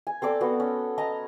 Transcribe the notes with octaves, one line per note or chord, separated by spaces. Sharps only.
G#5
C4 A4 D5 D6
B3 F#4
C#4
D#5 A5 A#5